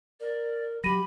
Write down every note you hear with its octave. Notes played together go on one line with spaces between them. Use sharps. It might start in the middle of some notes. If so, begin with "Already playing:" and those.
A#4 D5
F#3 G4 B5 A#6 D#7